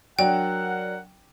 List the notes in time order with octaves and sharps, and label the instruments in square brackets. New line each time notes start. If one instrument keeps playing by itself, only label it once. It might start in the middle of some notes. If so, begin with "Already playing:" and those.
[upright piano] F#3 D4 [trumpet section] A#4 F#5 [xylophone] G5